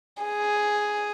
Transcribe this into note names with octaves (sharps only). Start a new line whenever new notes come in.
G#4